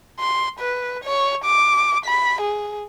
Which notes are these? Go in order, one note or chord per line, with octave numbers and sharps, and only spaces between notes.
C6
B4
C#5
D6
B5
G#4